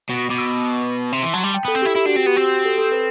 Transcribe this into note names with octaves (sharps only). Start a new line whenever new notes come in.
B2
B2 D6
E6
D6
C3 C6
E3
F#3 A5
G3
G5
B3 A4
C4
E4 G4
E4 G4
D4 F#4
C4 F#4
B3 G4
C4 F#4
G4
A4
A4
B4